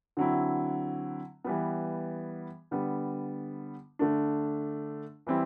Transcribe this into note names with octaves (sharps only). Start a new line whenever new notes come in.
D3 F#3 C4 E4
E3 G3 B3
D3 G3 B3
D3 A3 D4
E3 G3 C4 E4